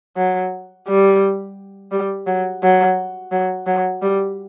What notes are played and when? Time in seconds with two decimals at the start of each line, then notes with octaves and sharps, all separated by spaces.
0.17 F#3
0.88 G3
1.92 G3
2.27 F#3
2.63 F#3
3.32 F#3
3.66 F#3
4.02 G3